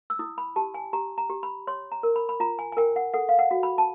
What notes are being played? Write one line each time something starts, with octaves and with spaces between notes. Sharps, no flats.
E6
E4 D#6
B5
G4 A5
G#5
G4 A#5
A#5
G4
B5
C#5 C6
A#5
A#4
B5
B5
F4 A#5
G#5
G#5
A#4 G5
F#5
A4 F#5
F5
F#5
F#4
B5
A5